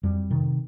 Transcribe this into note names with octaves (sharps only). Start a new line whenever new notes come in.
F2 G3
C3 D#3